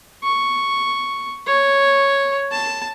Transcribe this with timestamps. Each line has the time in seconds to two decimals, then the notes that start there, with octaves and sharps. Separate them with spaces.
0.23 C#6
1.47 C#5
2.52 A5